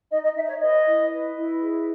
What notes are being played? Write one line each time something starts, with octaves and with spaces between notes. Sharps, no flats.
D#4 D#5
D#5
D#4 E5
C#5
B4 D#5
E4
B4
E4
G#4